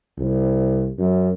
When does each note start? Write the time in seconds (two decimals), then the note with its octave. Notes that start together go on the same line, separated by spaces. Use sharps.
0.18 C2
0.99 F#2